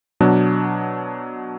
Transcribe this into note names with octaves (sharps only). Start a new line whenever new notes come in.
B2 F#3 D4